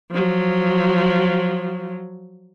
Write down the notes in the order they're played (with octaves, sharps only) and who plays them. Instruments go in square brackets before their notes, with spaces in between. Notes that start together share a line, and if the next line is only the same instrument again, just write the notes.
[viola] F3 F#3